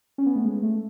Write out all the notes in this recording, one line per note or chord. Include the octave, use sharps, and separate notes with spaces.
C#4
B3
A3
G#3
A3